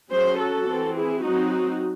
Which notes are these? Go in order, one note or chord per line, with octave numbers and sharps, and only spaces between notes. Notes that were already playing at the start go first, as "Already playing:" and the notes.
F#3 C#4 G#4 C5
F#4 A4
E3 C4
E4 G#4
F#3 C4 D#4 F#4